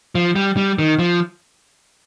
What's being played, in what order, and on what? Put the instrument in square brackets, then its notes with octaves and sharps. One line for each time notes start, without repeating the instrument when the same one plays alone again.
[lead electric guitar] F3
G3
G3
D#3
F3